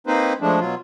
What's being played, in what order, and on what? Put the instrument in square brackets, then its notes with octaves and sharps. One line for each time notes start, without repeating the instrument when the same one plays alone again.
[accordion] A#3 C4 D#4 B4 C5
F3 G#3 A3 D4
B2 F#3 F4